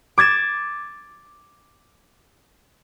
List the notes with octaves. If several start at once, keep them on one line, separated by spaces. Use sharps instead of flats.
D6 G#6 A6 E7